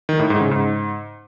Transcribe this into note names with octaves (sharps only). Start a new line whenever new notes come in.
D#3
A2
G#2
C#3
G#2